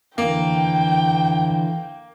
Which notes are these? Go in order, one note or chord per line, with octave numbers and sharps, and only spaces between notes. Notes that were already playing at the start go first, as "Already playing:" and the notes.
F2 D3 E3 A#3 G5